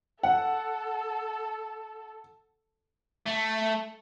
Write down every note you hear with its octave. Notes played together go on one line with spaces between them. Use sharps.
A4 F#5
A3